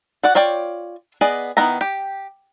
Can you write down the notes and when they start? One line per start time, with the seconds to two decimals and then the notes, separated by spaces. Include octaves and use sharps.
0.23 F#4 D5 F#5
0.35 F4 C#5 D5 G5
1.21 B3 G#4 D5 D#5
1.57 D#3 B3 E4 A#5
1.81 G4